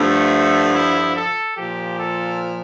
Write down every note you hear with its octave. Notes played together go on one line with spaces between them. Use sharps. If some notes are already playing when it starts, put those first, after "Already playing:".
Already playing: G2 D3 F3 A3
E4
A4
A#2 F3 G4
A4